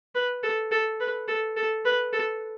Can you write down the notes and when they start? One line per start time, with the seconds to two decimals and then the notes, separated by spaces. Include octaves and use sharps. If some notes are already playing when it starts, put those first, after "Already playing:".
0.15 B4
0.43 A4
0.72 A4
1.00 B4
1.28 A4
1.57 A4
1.85 B4
2.13 A4